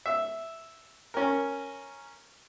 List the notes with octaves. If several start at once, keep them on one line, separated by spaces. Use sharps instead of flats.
E5
C#4 A#4